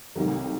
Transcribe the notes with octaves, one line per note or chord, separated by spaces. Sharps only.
C2 C3 D#3 F#3 A3